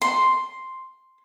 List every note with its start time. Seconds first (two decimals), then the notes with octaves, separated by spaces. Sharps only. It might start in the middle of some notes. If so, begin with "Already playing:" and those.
0.02 C6